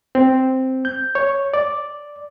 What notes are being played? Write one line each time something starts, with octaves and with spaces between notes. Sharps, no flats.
C4
G6
C#5
D5